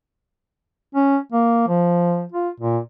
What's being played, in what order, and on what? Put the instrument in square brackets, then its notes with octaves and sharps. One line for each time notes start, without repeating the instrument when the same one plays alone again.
[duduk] C#4
A#3
F3
F4
A#2